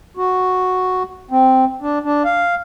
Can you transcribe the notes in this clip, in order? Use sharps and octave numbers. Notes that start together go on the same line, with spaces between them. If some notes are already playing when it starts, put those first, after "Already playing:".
F#4
C4
D4
D4
F5